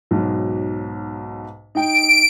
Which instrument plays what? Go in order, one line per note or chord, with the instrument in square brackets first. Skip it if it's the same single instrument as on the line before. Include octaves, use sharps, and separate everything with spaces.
[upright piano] B1 G#2 F#3
[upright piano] D#4 G5 [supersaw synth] D7